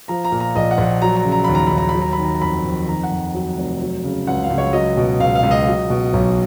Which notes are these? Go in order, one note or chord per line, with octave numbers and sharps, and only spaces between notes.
F3 A#5
A#5
A#2
A#5
A#1 D#5
F#5
A#1
F#3 A#5
A#5
C#3
A#5
D#2 B5
A#5
D#2 B5
A#5
B5
F#3
A#5
B5
D#3
A#5
A#5
F2 B5
F2
D#3 A#5
F#5
F2
F#3
F1
F#3
C#3
C#2 F#5
F5
C#2
C#5
F#3 D#5
B2
C#2 F5
F5
C#2
D#5
F#3
B2
B1